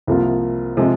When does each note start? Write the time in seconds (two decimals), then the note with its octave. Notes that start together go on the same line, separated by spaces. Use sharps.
0.07 C2 C3 F3 A#3 F4
0.77 C3 F3 G#3